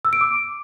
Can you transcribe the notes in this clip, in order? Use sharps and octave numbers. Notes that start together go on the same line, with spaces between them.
E6
D7
D6